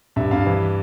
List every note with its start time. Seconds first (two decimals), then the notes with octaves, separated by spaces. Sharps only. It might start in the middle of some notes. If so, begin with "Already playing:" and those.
0.16 G2 E5
0.31 G2 F5
0.46 E3